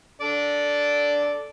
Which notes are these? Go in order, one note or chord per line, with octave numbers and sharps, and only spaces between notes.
D4 A4 D5